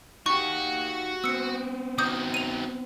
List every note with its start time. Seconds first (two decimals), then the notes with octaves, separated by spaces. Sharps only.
0.26 D#4 F#4 G4 C#6
1.24 B3 C4 E6 C#7
1.98 D#3 F#3 D6 D#6 G6
2.34 D#7 F7